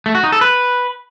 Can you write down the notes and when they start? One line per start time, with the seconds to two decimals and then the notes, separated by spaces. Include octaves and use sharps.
0.06 A3
0.15 F#4
0.24 D#4
0.32 A4
0.41 B4